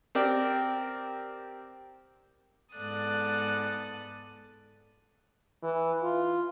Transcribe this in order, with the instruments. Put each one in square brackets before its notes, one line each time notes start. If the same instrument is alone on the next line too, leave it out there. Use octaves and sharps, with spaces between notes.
[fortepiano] C4 G4 A#4 D5 G5
[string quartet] G#2 B3 A4 D5 D#6 F#6
[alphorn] E3
F4